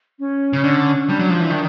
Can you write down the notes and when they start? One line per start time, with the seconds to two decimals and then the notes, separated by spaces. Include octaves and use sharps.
0.19 C#4
0.53 C#3
0.64 D3
1.07 G3 D4
1.19 F#3
1.30 F3
1.40 E3
1.51 D#3